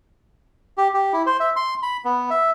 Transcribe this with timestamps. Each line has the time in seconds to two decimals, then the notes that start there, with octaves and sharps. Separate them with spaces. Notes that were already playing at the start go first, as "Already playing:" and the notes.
0.78 G4
0.94 G4
1.13 E4
1.26 C5
1.40 E5
1.56 C6
1.83 B5
2.05 B3
2.30 E5